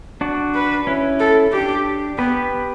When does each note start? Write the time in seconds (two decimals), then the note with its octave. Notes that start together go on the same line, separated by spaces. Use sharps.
0.21 D4 F#4
0.55 B4
0.87 C#4 E4
1.20 A4
1.52 D4 G4
2.18 B3 G4 B4